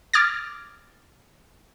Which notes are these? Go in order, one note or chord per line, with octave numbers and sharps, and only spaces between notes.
D6 F6 G#6 A6